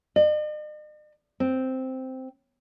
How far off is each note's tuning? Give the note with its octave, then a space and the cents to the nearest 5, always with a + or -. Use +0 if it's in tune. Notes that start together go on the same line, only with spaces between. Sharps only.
D#5 -45
C4 -5